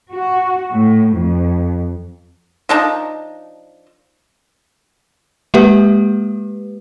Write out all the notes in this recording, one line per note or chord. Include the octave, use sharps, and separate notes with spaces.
F#4
A2
F2
F3 D4 D#4
G#3 A#3 G4 B4